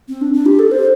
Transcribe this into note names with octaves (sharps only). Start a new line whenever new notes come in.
C4
D4
D4
G4
A4
C5